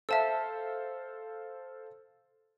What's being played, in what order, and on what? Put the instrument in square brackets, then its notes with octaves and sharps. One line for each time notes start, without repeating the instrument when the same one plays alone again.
[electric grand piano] A4 C5 F5 [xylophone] E5 A5 E6